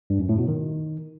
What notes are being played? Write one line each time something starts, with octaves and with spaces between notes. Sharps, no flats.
G2
F#2
A2
B2
D#3